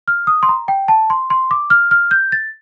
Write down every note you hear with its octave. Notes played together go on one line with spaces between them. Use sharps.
F6
D#6
C6
A#5
G5
A5
C6
C6
D6
F6
F6
G6
A6